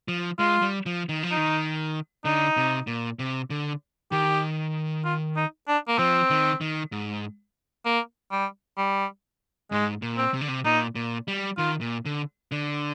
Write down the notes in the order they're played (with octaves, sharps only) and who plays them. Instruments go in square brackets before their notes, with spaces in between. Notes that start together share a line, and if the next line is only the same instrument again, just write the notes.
[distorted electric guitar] F3
[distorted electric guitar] G#3 [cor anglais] F4
[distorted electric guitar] G3
F3
D#3
F3
[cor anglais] D#4
[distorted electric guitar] D#3
[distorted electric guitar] D3 [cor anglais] D#4
[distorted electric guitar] C3
A#2
C3
D3
[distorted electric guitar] D#3 [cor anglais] G4
[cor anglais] F4
D#4
D4
A#3
[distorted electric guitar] F3 [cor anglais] C4
[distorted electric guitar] D#3
D#3
G#2
[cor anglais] A#3
G3
G3
[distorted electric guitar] G#2 [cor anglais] G#3
[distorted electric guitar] A#2
[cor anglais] C4
[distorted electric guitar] C3
D3
C3
[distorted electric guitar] A#2 [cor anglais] D#4
[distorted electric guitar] A#2
G3
[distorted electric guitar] D#3 [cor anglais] F4
[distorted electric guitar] A#2
D3
D3